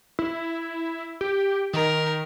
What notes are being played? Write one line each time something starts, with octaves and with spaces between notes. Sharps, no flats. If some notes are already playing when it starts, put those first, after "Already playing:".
E4
G4
D#3 A#4